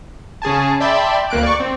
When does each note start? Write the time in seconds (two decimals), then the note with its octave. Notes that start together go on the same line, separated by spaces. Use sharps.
0.42 C#3 G#4 G#5 A5
0.80 D5 E5 G5 A5 B5 C6
1.30 D2 A#3 F#6 D7
1.43 D5 C#6
1.60 C4